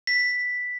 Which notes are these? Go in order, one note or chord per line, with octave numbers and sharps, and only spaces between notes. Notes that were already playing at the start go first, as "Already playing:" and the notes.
B6